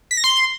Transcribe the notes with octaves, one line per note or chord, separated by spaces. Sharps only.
B6
A#6
C6